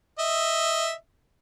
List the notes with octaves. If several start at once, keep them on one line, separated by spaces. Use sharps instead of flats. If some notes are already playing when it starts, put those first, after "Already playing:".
D#5 E5